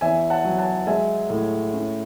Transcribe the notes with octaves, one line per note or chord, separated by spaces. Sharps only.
E2 E5 G#5
F#5 A5
F#3
F#5 A5
G#3 E5 G#5
A2
C#4